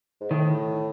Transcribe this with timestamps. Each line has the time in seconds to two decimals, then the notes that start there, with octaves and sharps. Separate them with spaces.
0.21 G#2
0.31 A2 D#3